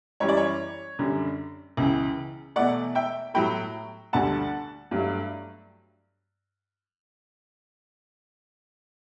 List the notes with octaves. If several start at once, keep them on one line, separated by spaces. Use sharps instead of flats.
F#2 E3 G3 C#5
D5
C#5
F#2 D3 G3
C#2 C#3 E3
E2 B2 A3 D5 F#5
E5 G5
A2 F#3 A3 G5 B5
D2 D3 G3 F#5 A5
G2 F#3 A3